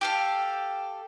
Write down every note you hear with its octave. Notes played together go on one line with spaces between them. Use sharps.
G4 A4 F5